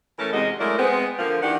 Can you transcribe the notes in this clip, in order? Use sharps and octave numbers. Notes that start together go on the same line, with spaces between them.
E3 A3 C#4 A4 A#4
E2 C3 G#3 F#4 D#5
F#3 G#3 A3 E4 A#4 D5
G#3 B3 C4
D3 F3 A#3
D#3 E3 D4 G4 F#5